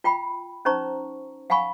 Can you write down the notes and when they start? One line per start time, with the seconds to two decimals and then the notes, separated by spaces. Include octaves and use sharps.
0.04 F4 G5 B5
0.65 C#4 D#4 C5 A#5 C#6
1.50 F5 F#5 G#5 B5 C#6